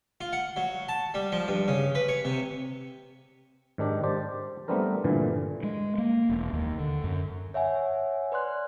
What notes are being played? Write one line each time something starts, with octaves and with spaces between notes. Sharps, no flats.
F4
F#5
F#3
A5
G3
F3
G2
C#3
B4
C#5
C3
G#2 D#3 D4 G4
G4 C5 D5 A5
G3 A3 B3 C4 D4 A#4
G2 A#2 D3 E3
G#3
A#3
E1
D#2
D3
F#2
C#5 E5 F#5 G#5
B4 D5 C6 F#6